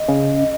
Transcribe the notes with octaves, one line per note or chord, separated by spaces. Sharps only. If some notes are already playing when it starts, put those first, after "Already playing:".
Already playing: D#5
C#3